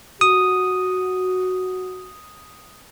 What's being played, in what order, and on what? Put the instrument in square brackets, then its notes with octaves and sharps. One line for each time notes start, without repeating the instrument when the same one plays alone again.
[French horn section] F#4 [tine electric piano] D#6